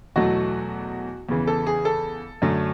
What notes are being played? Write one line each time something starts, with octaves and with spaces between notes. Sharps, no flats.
E2 B2 F#3 A3 F#4
E2 C#3 E3
A4
G#4
A4
F#2 D3 F#3 A3